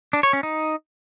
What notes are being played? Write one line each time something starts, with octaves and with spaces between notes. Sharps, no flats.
D4
C#5
C#4
D#4